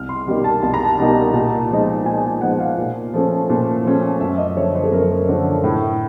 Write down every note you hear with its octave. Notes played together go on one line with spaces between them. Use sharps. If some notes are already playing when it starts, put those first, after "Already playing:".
Already playing: C2 F6
C6
B2 G3 A#3 D#4
A5
C2 A5
A#5
A5
B2 G3 A#3 D#4
A#2
F3 G#3 B3 D#4
A#2 G#5
F3 G#3 B3 D#4 F#5
F5
A#2
F3 A3 C#4
A#2
F3 A3 C#4
F#2 E5
D#5
D3 F3 A3 C#5
C5
A4
F#2 A#4
D3 F3 A3
A2